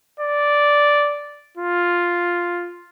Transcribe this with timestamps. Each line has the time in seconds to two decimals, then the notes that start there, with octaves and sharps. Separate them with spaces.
0.20 D5
1.57 F4